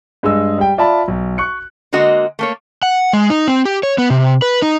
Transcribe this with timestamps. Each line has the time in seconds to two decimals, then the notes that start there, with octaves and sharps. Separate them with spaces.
0.23 G2 G#3 G#4 D#5 E6
0.58 G3 G5
0.78 F4 D5 E5 A5 B5
1.08 B1
1.38 C#6 F#6 C#7
1.93 D3 G#3 A#3 F#4 D#5
2.39 A3 A#3 C#5
2.83 F#5
3.13 G#3
3.30 D#4
3.48 C4
3.65 G4
3.83 C#5
3.98 B3
4.10 C3
4.42 B4
4.62 D#4